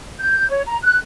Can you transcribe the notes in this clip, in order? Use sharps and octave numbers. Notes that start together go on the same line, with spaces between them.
G6
C#5
A#5
F#6